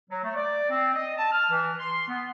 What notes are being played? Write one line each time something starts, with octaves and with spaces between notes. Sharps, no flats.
F#3
A3
D5
C4
D#5
A5
F6
E3
C6
B3